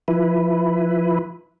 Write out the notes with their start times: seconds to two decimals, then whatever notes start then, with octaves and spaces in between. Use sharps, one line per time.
0.08 F3 E4 B4